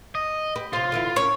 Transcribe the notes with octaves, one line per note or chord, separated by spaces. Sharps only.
D#5
G4 B4
C3 F4 C5
D3 E3 E4
C#4 A#4 C#5